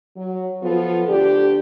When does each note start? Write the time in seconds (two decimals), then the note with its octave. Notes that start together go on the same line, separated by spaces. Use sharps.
0.16 F#3
0.61 F3 B3 F4 A4
1.08 D2 D4 G4